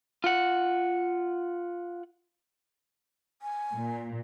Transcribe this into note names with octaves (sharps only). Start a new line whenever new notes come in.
F4 F#5
G#5
A#2